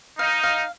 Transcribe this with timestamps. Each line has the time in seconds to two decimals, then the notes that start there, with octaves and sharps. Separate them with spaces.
0.19 D#4 F5
0.43 F5